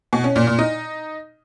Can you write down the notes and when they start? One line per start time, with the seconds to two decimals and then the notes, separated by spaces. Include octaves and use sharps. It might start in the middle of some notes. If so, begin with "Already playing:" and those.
0.13 B2
0.24 C#4
0.36 A#2
0.47 A#2
0.59 D#4